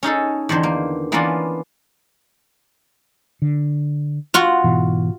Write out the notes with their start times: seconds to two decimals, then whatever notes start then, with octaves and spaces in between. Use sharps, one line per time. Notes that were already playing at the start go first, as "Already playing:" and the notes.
0.03 C#4 D#4 G#4 A4
0.49 E2 D3 D#3 C5
0.63 A#3
1.12 E3 A#3 B3 C#4 D4 F4
3.42 D3
4.34 F4 F#4 F#5
4.64 G#2 B2 E3